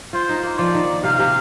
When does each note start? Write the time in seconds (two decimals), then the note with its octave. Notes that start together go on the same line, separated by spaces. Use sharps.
0.13 F4 C5
0.29 D#4
0.43 A#3
0.58 F3 D5
0.74 D#3
1.04 C3 F5
1.19 C3